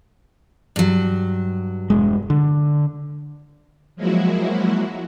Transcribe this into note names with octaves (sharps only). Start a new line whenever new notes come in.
G2 F#3
E1 G#3
D3
F3 F#3 G#3 A#3 E4 F#4